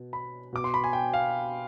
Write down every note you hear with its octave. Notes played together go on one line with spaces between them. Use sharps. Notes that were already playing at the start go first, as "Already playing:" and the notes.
Already playing: B2
B5
B2 D6
C6
B5
G#5
G5
F5